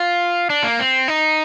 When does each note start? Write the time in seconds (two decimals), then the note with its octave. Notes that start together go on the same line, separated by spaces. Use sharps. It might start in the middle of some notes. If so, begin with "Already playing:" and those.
Already playing: F4
0.50 D4
0.64 A#3
0.79 C4
1.08 D#4